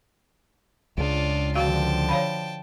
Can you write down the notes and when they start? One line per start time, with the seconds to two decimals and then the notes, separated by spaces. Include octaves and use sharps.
0.97 C#2 C#3 D4 F4
1.55 D3 D#3 F3 F#4 F5 G5 A5
2.09 C#5 F5 B5